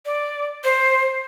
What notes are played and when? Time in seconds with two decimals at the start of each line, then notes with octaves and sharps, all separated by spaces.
0.05 D5
0.64 C5